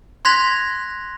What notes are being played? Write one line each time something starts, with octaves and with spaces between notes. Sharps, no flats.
C6 F#6 G#6 A#6 B6 F7